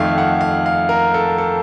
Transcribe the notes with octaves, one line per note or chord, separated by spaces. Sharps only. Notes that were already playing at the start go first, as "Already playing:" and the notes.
Already playing: F2 D#3 A3 F5
F#5
F5
F5
A#4
A4
A4